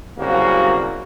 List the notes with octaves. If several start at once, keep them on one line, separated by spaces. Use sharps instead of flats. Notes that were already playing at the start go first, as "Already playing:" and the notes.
C2 C#3 F#3 A#3 F#4